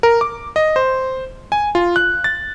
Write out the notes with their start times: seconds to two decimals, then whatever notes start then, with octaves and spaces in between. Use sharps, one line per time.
0.03 A#4
0.21 D6
0.56 D#5
0.76 C5
1.52 G#5
1.75 F4
1.96 F#6
2.24 A6